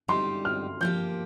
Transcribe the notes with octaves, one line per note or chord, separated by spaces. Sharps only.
G3 D#4 G4 C6
F6
F3 A#3 G4 G6